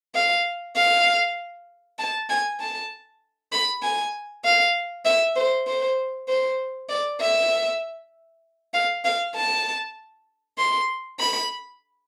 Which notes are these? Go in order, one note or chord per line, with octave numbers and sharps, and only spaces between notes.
F5
F5
A5
G#5
A5
B5
G#5
F5
E5
C5
C5
C5
D5
E5
F5
F5
A5
C6
B5